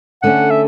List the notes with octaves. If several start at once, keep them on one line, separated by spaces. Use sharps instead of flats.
D3 A3 C#4 F#5
E5